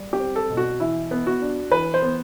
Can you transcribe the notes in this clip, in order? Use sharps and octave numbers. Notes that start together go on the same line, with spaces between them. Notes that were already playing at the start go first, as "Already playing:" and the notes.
Already playing: G3
G4
C4
A4
B2
F#4
E3 E4
B3
F#4
D4
E3 B4
C5
B3